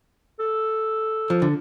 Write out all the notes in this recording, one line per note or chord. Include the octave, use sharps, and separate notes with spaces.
A4
F3
D3